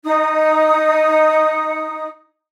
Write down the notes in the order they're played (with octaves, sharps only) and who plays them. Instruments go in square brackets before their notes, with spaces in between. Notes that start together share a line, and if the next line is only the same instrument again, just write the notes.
[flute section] D#4 D#6